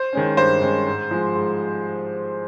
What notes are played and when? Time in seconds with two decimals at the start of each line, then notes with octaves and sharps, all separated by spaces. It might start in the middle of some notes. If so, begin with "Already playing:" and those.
Already playing: C5
0.13 D#3 G#3 C#4
0.37 G2 C5
0.62 D#3 G#3 C#4
0.87 G#2
1.11 F3 G#3
1.35 G#2